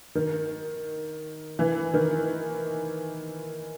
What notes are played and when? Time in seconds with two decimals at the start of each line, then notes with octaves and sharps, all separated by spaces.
0.15 D#3
1.59 E3
1.94 D#3